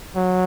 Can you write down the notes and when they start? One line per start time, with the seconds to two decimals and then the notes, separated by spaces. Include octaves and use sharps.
0.16 F#3